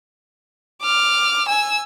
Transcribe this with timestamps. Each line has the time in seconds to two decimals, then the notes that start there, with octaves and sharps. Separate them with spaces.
0.82 D6 F6
1.48 G#5 E6